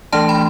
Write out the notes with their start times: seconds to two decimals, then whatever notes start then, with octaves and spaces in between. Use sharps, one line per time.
0.13 E3 A3 D4 A5
0.29 B5